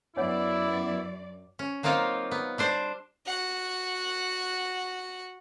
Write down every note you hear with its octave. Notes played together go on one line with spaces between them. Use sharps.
F#2 B3 D4 E4 C#5 D5 F#5
C#4
F#3 A#3 C4 D#4 F4
B3
G3 D4 C5
F#4 F#5